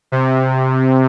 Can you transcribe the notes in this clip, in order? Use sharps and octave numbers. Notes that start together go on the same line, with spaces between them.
C3